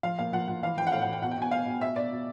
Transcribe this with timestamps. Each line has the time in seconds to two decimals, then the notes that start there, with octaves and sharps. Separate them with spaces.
0.03 F3 F5
0.18 A#2 F5
0.32 F3 F#5
0.48 F3 F#5
0.63 E3 F5
0.77 E3 G5
0.87 F#5
0.92 A2 F5
1.02 F#5
1.07 E3
1.13 G5
1.22 B2 F#5
1.31 G5
1.37 B2 G#5
1.51 B2 F5
1.66 B2
1.81 B2 E5
1.96 B2 D5
2.11 B2